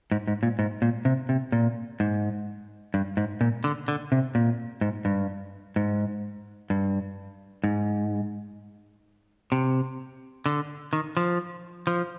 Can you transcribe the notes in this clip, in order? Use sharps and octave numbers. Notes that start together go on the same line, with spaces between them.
G#2
G#2
A#2
G#2
A#2
C3
C3
A#2
G#2
G2
G#2
A#2
D3
D3
C3
A#2
G#2
G2
G#2
G2
G#2
C3
D3
D#3
F3
F3